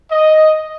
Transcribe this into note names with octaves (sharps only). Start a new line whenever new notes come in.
D#5